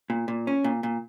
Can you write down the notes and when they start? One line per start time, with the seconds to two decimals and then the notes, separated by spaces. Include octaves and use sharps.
0.10 A#2
0.28 A#2
0.47 C#4
0.64 A#2
0.83 A#2